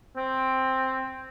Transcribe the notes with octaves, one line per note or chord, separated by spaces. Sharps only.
C4